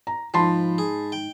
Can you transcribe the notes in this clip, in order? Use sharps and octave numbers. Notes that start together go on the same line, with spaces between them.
A#5
G#2 F3 D#4 A5 B5 C6
G#4
G5